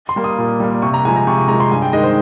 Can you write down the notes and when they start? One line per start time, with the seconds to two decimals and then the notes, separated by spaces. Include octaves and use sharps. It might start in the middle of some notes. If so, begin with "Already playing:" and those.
0.09 C6
0.16 G3 A#3
0.24 D#6
0.38 A#2
0.60 G3 A#3
0.82 C3 C#6
0.94 A#5
1.05 F3 G#3 G#5
1.16 A#5
1.27 C3 C#6
1.38 C#6
1.48 F3 G#3 A#5
1.60 C6
1.71 G2 G#5
1.82 G5
1.93 D#3 G#3 D#5
2.04 C5